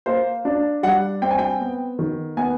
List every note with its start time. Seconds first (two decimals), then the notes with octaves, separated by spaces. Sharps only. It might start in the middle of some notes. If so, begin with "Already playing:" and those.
0.06 A#3 C5
0.45 D4
0.83 G3 F#5
1.22 C4 G5
1.31 G#5
1.39 G5
1.60 B3
1.99 D#3
2.37 B3 G#5